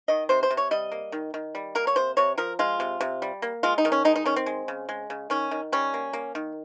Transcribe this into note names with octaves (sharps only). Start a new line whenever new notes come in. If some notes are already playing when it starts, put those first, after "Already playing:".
D#3 D#5
C3 C5
C5
C3
C#5
G3 D#5
A#3
D#3
D#3
G3
A#3 A#4
C#5
C3 C5
C3 C#5
F3 A#4
G#3 F4
C3
C3
G3
A#3
G#3 F4
D#4
D#3
C#4
G#3 D#4
D#4
D#3 C#4
C4
G#3
C#3
G#3
C#3
D#3 C#4
D#3
G3 C#4
A#3
A#3
D#3